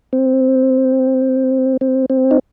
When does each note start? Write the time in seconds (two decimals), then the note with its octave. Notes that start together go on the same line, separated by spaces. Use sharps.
0.13 C4
1.81 C4
2.10 C4
2.31 D#4